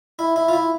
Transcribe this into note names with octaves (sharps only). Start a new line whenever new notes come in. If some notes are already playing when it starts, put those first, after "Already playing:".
E4
E4
F4
E4